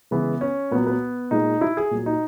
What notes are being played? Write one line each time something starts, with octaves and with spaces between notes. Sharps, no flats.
C#3 E3 G#3 B3
C#4
A#2 F#3 B3
B3
A#2 G#3 D#4
E4
G#4
A#2 F#3
D#4